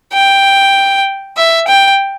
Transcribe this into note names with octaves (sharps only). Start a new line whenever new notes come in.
G5
E5
G5